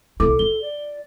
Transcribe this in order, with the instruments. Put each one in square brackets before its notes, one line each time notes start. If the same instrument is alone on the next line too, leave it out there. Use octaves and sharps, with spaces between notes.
[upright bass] B1 E4 [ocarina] A4 [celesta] D6
[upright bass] F4 [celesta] G7
[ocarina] D5